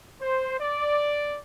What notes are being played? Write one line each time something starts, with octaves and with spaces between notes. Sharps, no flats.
C5
D5